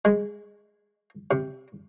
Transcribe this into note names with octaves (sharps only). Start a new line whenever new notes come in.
G#3
C3